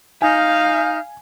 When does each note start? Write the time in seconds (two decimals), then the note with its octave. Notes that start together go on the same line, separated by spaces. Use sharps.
0.22 D#4 F5 G#5 F6 G6